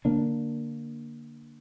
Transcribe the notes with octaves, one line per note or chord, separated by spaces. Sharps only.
D3 A#3 D4